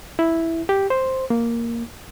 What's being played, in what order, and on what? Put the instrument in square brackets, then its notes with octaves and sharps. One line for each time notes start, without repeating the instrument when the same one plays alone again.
[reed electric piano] E4
G4
C5
A#3